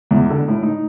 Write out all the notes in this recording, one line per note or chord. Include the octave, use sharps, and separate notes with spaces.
E2
D3
A2
D#4